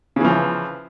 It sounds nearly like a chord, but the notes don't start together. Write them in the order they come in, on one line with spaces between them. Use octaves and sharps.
C#3 E3 F3